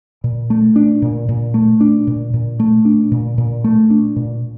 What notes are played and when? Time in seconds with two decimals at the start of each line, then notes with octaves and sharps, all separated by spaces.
0.24 A#2
0.50 A3
0.76 D4
1.02 A#2
1.29 A#2
1.54 A3
1.81 D4
2.07 A#2
2.34 A#2
2.60 A3
2.85 D4
3.12 A#2
3.38 A#2
3.64 A3
3.90 D4
4.16 A#2